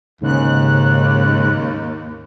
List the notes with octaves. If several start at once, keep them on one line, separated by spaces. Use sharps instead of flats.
D#2 G#2 C#3 F#6